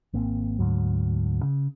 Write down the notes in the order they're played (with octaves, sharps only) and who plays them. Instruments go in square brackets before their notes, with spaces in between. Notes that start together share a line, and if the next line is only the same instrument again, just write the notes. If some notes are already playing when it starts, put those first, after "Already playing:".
[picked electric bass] G#1 A#3 C4
D2 G#2 F#3
C#3